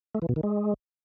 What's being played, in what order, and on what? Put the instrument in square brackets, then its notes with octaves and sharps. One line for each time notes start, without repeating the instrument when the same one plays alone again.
[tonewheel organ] A3
E3
B2
D#3
G#3